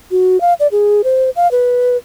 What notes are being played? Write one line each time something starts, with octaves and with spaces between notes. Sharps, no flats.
F#4
F5
D5
G#4
C5
F5
B4